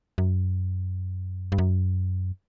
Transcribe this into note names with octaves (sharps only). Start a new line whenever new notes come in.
F#2
G2
F#2